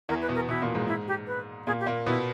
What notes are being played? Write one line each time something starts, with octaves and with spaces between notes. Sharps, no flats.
E2 E3 A#4
B4
B2 B3
A#4
B2 B3 E4
A#2 A#3
G#2 G#3
E4
G4
B4
A#2 A#3 G#4
G4
A#2 A#3
B2 B3 E4